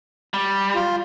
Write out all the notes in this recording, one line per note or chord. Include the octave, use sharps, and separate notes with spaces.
G3
F4